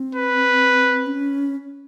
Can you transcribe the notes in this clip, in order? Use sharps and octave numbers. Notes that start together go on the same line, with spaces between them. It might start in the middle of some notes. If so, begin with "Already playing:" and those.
Already playing: C4
B4
C#4